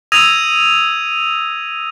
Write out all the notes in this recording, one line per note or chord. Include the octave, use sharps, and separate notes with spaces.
D#6 E6 G#6 A#6 D#7 F7